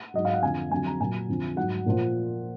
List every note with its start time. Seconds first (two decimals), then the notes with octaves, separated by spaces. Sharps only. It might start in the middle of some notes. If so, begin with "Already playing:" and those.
Already playing: F#5
0.14 G#2 F#3 D#5
0.25 F5
0.34 F#5
0.43 F2 D3 F3 G#5
0.71 F2 D3 F#3 G#5
0.86 A#5
1.00 A#2 F#3 G#5
1.28 F2 D3 F3
1.56 G#2 F#3 F#5
1.86 A#2 F3